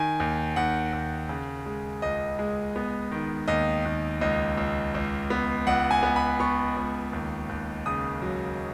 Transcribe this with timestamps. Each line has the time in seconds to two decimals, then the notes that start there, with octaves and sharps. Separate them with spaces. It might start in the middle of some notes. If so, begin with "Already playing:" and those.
Already playing: D#3 G#5
0.20 D#2
0.56 D#2 F#5
0.93 D#2
1.29 C#3
1.66 G#3
2.02 C#2 D#5
2.39 G#3
2.76 B3
3.11 D#3
3.48 D#2 D#5
3.85 D#2
4.21 C#2 D#5
4.57 C#2
4.95 C#2
5.30 B3
5.67 C#2 F#5
5.91 G#5
6.03 B3
6.16 B5
6.40 B3 C#6
6.77 C#2
7.13 D#2
7.49 D#2
7.86 C#3 D#6
8.22 F#3